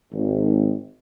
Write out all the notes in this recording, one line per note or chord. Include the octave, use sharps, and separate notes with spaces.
G#1